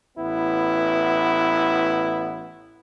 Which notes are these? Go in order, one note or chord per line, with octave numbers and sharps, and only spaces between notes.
A1 B3 E4